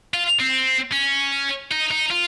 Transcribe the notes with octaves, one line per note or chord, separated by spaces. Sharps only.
F4
C4
C#4
D#4
D#4
F4